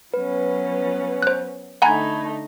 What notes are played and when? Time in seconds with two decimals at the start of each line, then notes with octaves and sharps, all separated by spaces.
0.14 F#3 B3 C#4 B4
1.22 C5 F#6
1.82 D3 A3 D#4 F#5 G#5 A#5 B5 G#6